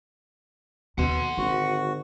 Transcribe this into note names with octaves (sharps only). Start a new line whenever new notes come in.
D#2 B2 F3 F#5 C6
G#1 D3 F#4